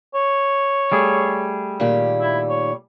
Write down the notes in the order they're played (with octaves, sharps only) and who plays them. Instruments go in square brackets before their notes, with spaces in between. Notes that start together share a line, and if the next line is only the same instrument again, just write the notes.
[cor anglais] C#5
[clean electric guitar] G3 A3 G#4
[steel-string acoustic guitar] A#2 D#3 G4
[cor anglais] E4
C#5